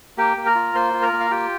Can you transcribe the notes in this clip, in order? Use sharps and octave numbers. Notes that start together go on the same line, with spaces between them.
A#3 G4 G5
A#3
A#4 A#5
F4
A#3 C5 C6
F4
A#4 A#5
A#3
F5
F4 G4 G5